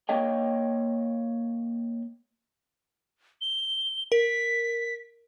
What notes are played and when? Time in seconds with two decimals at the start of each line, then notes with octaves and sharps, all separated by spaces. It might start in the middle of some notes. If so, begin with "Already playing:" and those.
0.09 A#3 C#5 D#5 G5
3.41 G7
4.12 A#4 B6